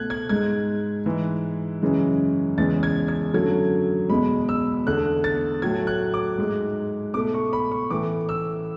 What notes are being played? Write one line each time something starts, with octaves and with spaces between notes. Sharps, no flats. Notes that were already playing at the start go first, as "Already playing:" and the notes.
Already playing: B2 A3 F#6 G#6
G#6
G#2 G#3 G#6
G#2 E3 G#3
F#2 C#3 E3 G#3
E2 C#3 E3 G#3 A6
G#6
G#6
F#2 D3 F#3 A3 G#6
E2 B2 G#3 B5
E6
E2 D3 A3 F#6
A6
A2 F#3 A3 G#6
F#6
D6
G#2 G#3
B2 A3 D6
C#6
B5
C#6
A2 E3 A3 D6
E6